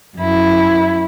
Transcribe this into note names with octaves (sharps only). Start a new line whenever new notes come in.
F#2 E4